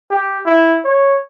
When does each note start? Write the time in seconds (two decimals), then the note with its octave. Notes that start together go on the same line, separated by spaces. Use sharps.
0.11 G4
0.46 E4
0.85 C#5